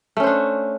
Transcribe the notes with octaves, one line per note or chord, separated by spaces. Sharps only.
A3 C#4 D4 C5